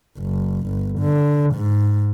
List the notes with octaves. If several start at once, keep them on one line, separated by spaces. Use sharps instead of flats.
F#1
G1
D3
G#2